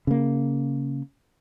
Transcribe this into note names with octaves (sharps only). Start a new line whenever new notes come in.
C#3 A#3